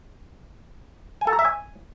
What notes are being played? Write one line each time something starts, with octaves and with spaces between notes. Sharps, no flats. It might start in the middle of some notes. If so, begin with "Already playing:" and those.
G#5
A4
A#5
E5
G#5